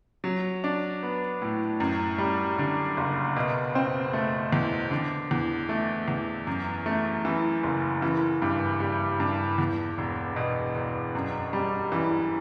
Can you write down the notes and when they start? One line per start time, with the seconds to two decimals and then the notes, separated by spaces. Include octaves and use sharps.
0.24 F#3
0.64 D4
1.03 B3
1.42 A2
1.80 F#2
2.18 G3
2.58 D3
2.97 F#1
3.36 B2
3.75 C4
4.13 A3
4.53 E2
4.91 D3
5.31 E2
5.69 A3
6.08 E2
6.47 F#2
6.86 A3
7.25 E3
7.63 F#1
8.02 E3
8.42 G2
8.80 G3
9.20 G2
9.58 E2
9.98 E1
10.36 B2
10.75 E1
11.15 F#2
11.53 G3
11.92 E3